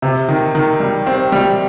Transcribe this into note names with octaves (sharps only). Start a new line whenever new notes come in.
C3
D#3
D#3
G3
C4
G3